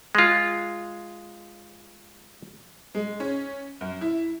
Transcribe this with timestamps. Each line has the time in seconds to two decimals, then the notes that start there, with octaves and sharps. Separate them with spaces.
0.15 G#3 F4
2.95 G#3
3.20 C#4
3.81 F#2
4.01 E4